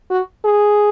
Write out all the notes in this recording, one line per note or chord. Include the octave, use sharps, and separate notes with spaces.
F#4
G#4